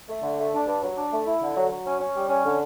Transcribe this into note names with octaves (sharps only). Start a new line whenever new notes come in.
A3
D3
A3
D4
G2
F#3
D4
A3
E4
D3
F#3
F#3
C#4
C#4
G3
C#4
D3